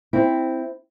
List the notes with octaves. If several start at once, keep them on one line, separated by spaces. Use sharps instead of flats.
C4 E4